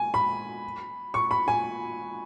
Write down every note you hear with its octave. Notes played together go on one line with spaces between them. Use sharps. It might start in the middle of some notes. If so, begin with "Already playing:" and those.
Already playing: G#5
B5
C#6
B5
G#5